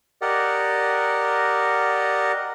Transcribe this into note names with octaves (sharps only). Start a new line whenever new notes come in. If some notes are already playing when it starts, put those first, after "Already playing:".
G4 A#4 D5 D#5 F#5